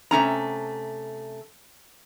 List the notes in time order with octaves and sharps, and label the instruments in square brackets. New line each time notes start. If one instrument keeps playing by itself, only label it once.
[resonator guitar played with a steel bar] C3 A3 C#4 A#5